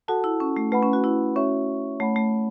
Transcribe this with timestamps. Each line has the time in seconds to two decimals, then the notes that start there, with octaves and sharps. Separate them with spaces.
0.08 F#4 A4 F#5 A5
0.24 E4
0.40 C#4
0.56 A3
0.72 A3 B4 F#5 B5
0.83 C#4
0.93 F#4
1.04 E4
1.35 C#4 F#4 C#5 E5 C#6
2.00 A3 C#5 F#5 B5
2.16 A3